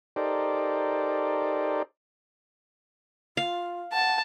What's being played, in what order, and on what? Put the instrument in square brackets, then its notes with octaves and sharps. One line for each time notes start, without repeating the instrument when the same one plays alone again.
[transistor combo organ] D#4 G4 A4 A#4 C5 D5
[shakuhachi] F4 [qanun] F5
[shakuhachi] F#5 [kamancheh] A5